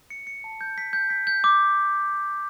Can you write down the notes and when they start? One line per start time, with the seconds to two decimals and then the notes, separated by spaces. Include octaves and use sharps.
0.10 C#7
0.27 C#7
0.44 A5
0.61 G6
0.78 B6
0.93 G6
1.10 B6
1.27 G6
1.44 D6